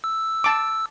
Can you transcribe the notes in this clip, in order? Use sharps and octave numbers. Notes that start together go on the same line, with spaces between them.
E6
A5 D6